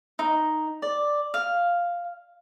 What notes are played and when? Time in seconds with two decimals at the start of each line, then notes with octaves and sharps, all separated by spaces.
0.19 D#4
0.82 D5
1.34 F5